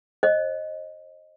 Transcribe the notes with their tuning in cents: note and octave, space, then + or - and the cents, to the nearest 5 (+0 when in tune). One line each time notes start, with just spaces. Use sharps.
C5 +35 D#5 +0